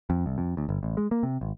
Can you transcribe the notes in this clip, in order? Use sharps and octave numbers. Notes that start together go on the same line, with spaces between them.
F2
C2
F2
D2
G1
A1
G#3
A#3
C3
G#1